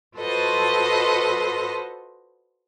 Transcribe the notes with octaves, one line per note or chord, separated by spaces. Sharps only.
F4 F#4 A4 B4 C5 D#5